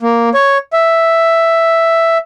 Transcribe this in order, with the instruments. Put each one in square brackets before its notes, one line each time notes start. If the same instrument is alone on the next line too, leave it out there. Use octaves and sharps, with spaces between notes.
[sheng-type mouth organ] A#3
C#5
E5